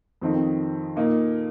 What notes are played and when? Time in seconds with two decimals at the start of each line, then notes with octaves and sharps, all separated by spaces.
0.22 F2 D#3 C4 D#4
0.96 A#2 A#3 D#4